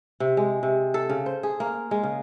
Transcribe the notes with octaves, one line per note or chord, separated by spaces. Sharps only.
C3
G#3
C3
A4
C#3
C5
G#4
A#3
G#3
C#3